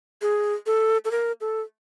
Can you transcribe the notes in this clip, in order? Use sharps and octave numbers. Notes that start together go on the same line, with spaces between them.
G#4
A4
A4
A#4
A4